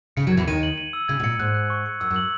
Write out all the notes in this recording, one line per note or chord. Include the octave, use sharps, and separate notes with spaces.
C#3 C#7
F#2 F#3
G#6
E2 E3
D#2 D#3 D#7
F#7
D#7
E6
C#3 G#6
B2
A#2 C#7
G#2 F#6
F#6
C#6
C#7
F#2 E6
F#2
F#7